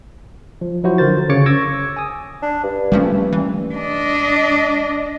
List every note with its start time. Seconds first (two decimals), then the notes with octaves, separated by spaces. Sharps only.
0.61 F3
0.83 F3 F#3 E4 F#4 C5
0.98 D3 A#4 C5 A6
1.29 C#3 C#5 D6 A6 C#7
1.46 C#6 D6 E6 G#6 A#6
1.96 G#5 D#6
2.42 D4
2.64 G2
2.92 F3 G3 A3 A#3 C#4
3.33 E3
3.75 D4 D#5